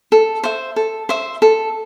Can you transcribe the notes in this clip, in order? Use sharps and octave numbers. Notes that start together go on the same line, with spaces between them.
A4
C5 E5
A4
C5 E5
A4